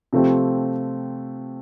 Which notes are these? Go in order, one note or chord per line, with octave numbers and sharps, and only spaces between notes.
C3 F3 A3 C4 G4